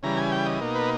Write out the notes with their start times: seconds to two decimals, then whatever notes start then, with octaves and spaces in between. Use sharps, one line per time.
0.03 C#3 E3 G3 A#5
0.17 G#5
0.32 G5
0.46 D#5
0.61 B2 A#3 D#4
0.75 B4